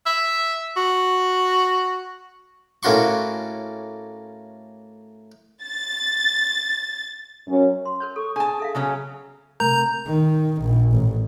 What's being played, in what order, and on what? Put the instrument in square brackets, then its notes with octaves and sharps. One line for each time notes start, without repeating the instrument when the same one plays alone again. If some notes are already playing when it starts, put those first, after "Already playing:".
[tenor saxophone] E5
F#4
[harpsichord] A2 A#3 C#4 F#4 C6 C#6
[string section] A6
[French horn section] F#2 C#4
[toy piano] C6
A#4 C5 C#5
[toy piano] A4 [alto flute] C#6
[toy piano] D4 [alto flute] G#4 [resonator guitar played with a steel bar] G#5 A5
[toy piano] A4 E5 F5
[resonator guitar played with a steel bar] C#3 F#3 C#4
[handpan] C3 A3 A#4 [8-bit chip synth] A#5 G6
[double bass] D#3
A#1
A1